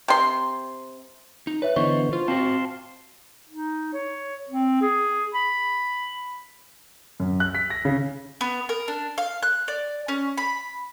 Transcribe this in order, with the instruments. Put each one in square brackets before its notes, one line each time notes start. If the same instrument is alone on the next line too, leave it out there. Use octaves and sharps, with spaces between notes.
[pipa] C3 C6
[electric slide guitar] D#4
[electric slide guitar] B4 [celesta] C#5 E5
[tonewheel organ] D3 E3 B3 [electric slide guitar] C5 D#5 [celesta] C#6
[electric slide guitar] F4 [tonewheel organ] C5
[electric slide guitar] C4 F#4 C5 [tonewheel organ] F5 A5 C6
[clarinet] D#4
C#5
C4
G#4
B5
[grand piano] F#2
F#6
B6
A#6
C#3
[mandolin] B3
A#4
D4
F5
F#6
D5
C#4
B5